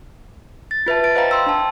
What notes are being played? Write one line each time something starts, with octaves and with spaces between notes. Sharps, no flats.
A6
F4 B4 E5 A5
A6 D7
C5 D#5 F5 G5 A#5 B5
G5 C6 E6
D4 A5